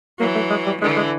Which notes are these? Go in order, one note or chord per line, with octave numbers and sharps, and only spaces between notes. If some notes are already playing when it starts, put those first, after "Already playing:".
E3 F#3 A#3
A3
G#3
G3
D3 E3 G#3
G#3